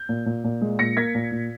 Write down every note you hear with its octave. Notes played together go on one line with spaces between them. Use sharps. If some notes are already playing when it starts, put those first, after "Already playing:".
Already playing: G6
A#2
A#2
A#2
G#3
A#2 A#6 C#7
A#3 G#6 B6
A#2
A#2